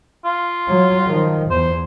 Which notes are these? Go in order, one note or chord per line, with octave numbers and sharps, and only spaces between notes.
F4
F#3
D#3 F3
E2 C5